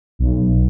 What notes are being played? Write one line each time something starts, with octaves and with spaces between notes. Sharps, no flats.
B1